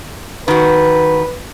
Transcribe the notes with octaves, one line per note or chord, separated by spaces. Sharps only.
D#3 F#4 B4